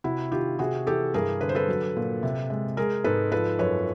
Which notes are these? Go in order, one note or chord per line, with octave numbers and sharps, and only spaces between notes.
C3 E4 F#4
D#3 F4 G4
C3 F#4 G#4
E3 G4 A4
G2 G#4 A#4
D3 B4
C5
A4 B4
F#3
A#2
C3
G#3
G#3 G#4 A#4
G#2 A4 B4
F3 A4 B4
F#2 B4 C#5